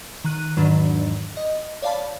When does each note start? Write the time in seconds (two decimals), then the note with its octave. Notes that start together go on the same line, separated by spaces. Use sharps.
0.24 D#3 F#6 D#7
0.57 E2 G#2 D#3 F#3 D4 B5
1.37 D#5
1.82 C#5 D5 F5 A5 B5